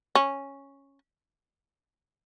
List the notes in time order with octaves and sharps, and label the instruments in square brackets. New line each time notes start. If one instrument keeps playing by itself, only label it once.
[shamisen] C#4